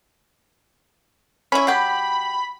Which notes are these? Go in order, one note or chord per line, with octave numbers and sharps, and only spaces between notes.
C#4 E4 B5
F#3 G4